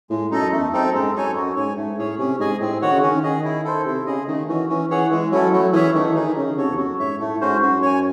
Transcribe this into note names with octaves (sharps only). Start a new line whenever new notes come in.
A2 G#3
F#2 D#4 A4 D#5
E2 A3
F#2 C4 D#4 A4
G#2 G#3
F#2 D#4 A4 C#5 G#5
F#2 F#4
G#2 C#5 G#5
G#2 A3
A2 C#4 G#4 C#5
C3 C#4
G#2 G#4 D#5 G#5
A2 C4
D#3 F#4 C#5 F#5
C#3
D#3 C#4
G#4 D#5
E4
A4 C5
C3 E4
C#3 G#4 D#5
D#3 A3
E3 C#4 F#4
E3 C#4
E3 G#4 C#5 F#5
E3 G#3
F#3 C#4 E4 A4
F#3 A3
E3 C#4 G#4 C#5 E5
D#3 A3
E3
D#3 D#4 G#4
D#3
C#3 C#4
C3 F#4 A4 C#5
E2
F#2 F#4
G#2 C#5 E5
A2 A3
A2
G#2 C#4 F#4 C5
G#2
F#2 F#4
C#5 G#5